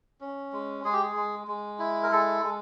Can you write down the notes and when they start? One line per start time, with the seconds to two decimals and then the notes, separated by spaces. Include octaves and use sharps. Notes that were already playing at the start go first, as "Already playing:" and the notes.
0.21 C#4
0.53 G#3
0.85 G#3 G#4
0.93 G4
1.02 G#4
1.16 G#3
1.48 G#3
1.79 E4
2.03 A#4
2.12 G#3 A4
2.43 G#3